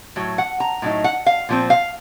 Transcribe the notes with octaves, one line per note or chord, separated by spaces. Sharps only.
A2 F#3
F#5
A#5
A2 F#3 D#4
F#5
F5
A#2 F3 C4
F5